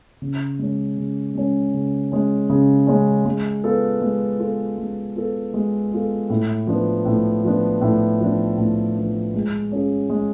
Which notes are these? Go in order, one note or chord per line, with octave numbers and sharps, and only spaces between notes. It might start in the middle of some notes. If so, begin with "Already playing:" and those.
C#3
G#3 C#4
C#3
G#3 C#4
C#3
G#3 C#4
C#3
G#3 C#4
G#3
B3 F4 A4
G#3
B3 F4 A4
G#3
B3 F4 A4
G#3
B3 F4 A4
A2
F3 B3 D4
A2
F3 B3 D4
A2
F3 B3 D4
A2
F3 B3 D4
G#3
C#4 F4 G#4
G#3